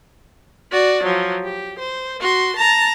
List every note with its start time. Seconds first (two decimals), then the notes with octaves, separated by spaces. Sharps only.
0.72 F#4 D5
1.03 F3 F#3
1.44 G4
1.79 C5
2.20 F#4 C6
2.56 A5 A#5